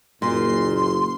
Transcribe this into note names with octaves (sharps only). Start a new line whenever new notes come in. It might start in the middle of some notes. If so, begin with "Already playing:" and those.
F#1 A#2 C6